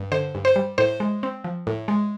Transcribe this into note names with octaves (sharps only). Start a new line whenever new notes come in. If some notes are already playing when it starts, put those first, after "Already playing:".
Already playing: G2
D3 C5
G2
C5
G3
A2 C5
G#3
C4
F3
A2
G#3